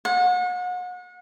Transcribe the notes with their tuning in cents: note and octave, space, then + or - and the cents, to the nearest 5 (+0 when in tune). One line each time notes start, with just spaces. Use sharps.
F#5 -35